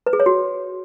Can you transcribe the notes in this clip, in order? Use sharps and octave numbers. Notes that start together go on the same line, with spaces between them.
B4
G#4
C#5
F#4